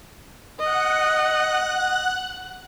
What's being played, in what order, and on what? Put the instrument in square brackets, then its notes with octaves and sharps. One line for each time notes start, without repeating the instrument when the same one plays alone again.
[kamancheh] D#5 [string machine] F#5 F#6